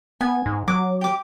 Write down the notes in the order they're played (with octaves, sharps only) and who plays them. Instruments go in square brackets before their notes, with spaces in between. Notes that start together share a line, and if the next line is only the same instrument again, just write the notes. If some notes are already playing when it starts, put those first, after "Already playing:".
[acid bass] B3 [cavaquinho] G#5
[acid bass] G#2
[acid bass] F#3 [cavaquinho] D6
[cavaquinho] G4 D6